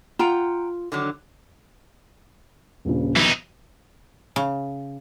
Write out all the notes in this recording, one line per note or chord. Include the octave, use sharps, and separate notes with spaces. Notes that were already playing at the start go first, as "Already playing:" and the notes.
F4 F#5 G5 A#5
D3 D#3 F#3
D#1 A#1 C#3
B1 E3 D#4
C#3